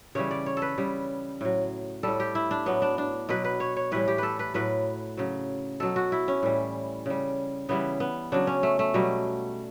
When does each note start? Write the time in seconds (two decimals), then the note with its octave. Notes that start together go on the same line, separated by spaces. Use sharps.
0.15 C#3 E3 G3 C#5
0.31 D5
0.46 C#5
0.57 A4
0.62 B4
0.78 C#3 G3
1.41 A2 F#3
2.03 A2 G3 A4
2.20 G4
2.35 E4
2.51 D4
2.66 A2 F#3 B3
2.82 D4
2.98 D4
3.29 B2 F#3 B4
3.44 B4
3.60 C#5
3.76 C#5
3.92 A2 E3 G3 B4
4.08 G4
4.18 A4 B4
4.39 B4
4.54 A2 F#3 B4
5.17 C#3 F#3
5.80 B2 F#3 A4
5.96 F#4
6.12 E4
6.28 C#4
6.43 A2 E3 G3
7.06 C#3 G3
7.69 C#3 E3 G3 B3
8.00 B3
8.32 C#3 F#3 D4
8.47 C#4
8.63 A3
8.79 A3
8.94 B2 F#3 G3